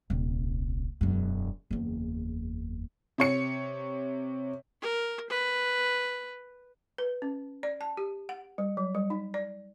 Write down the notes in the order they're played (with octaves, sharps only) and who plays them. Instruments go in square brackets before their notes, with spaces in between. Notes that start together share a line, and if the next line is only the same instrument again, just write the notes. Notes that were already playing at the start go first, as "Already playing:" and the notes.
[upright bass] D#1 C2
E1 F#2
F#1 E2
[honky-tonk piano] C3 C#5 C#7
[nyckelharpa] A#4
B4
[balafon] B4
C#4
D5
A5
G4
F#5
G3
F#3
G3
D#4
D5